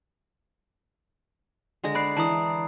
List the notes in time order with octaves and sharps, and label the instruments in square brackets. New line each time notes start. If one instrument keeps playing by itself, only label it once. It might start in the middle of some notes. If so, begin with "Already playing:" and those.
[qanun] D3 G#3 A#5
[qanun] D5 [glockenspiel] B5 F#6 C7
[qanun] E3 D5 [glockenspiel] A5 A#5 D#6